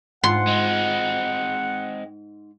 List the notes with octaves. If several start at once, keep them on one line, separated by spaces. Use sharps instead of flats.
G#2 F4 F#5 C6
G#3 C4